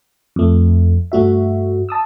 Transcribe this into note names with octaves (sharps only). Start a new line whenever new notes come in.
F2 A3
G2 A3 F#4 E5
A5 D#6 E6